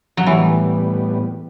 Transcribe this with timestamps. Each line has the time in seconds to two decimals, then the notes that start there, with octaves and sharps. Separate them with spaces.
0.17 F#3
0.26 A2 E3 G3 B3